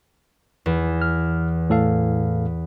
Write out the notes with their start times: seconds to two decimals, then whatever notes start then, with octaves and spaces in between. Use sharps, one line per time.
0.66 E2
1.02 F6
1.70 A2 A4 F5